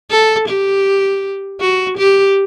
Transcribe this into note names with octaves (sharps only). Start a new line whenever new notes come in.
A4
G4
F#4
G4